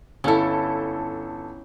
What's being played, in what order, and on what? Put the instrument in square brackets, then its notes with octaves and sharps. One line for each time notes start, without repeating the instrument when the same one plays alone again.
[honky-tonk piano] G1 A4 [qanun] C#4 E4